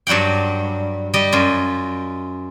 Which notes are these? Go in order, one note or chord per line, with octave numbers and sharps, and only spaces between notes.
G2 F#3 G3 F#5 G5
G3 G4 D#5
F#2 F4